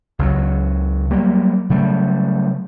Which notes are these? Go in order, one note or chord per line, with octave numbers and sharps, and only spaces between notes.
C#2 C#3 F#3
F#3 G3 A#3
C#3 F#3 G3 A3